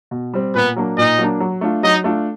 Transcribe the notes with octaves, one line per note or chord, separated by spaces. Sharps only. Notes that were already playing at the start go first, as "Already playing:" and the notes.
B2
G3 C4
A#2 B3 B4
F#3 A#3 D4
A#2 D#4 D#5
F#3 A#3 D4
F#3
A3 D4 F4
F#3 D#4 D#5
A3 D4 F4